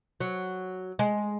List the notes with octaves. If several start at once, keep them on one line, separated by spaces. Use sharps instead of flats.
F#3
G#3